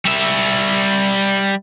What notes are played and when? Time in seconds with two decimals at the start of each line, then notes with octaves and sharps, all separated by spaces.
0.05 G3 E5